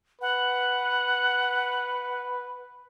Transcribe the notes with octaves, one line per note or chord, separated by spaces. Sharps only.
B4 F#5